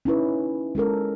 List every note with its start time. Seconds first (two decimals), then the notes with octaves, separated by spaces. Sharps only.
0.05 C#4 D#4 E4 B4
0.75 G#3 C#4 A4 A#4